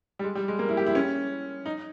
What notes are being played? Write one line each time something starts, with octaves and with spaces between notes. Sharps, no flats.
G3
G#3
G3
G#3
A#3
E4
G4
E4
C#4
D#4